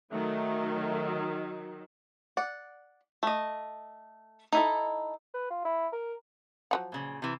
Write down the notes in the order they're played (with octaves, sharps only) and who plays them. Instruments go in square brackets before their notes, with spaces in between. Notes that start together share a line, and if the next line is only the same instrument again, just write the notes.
[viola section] D#3 F#3 [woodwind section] A3
[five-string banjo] D5 F#5
A3 D#5
D#4 E4 A4
[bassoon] B4
F4
E4
A#4
[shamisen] F3 F#3 F#5
[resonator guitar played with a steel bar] A#2 C#3
C3 E3